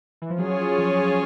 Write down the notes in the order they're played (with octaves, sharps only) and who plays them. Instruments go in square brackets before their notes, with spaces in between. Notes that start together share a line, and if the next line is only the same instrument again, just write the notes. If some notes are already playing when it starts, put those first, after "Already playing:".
[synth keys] E3
F3
[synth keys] F#3 [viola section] C#4 F4 G#4 C#5
[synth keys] F3